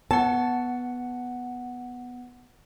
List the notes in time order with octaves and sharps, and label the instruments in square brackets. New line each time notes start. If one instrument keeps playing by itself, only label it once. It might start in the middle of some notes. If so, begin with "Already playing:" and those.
[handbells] B3 F#5 [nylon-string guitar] A5